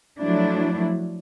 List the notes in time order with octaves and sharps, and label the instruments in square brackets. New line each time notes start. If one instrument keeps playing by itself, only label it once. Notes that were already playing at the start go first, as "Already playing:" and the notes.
[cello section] F3 F#3 A3 D4 E4